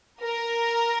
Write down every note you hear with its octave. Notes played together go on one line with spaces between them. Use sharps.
A#4